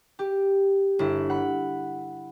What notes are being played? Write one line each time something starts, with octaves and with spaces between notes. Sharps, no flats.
G4
G1 E4
F#5 B5